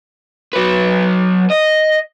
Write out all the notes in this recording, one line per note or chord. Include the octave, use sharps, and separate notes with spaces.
F#3 B4
D#5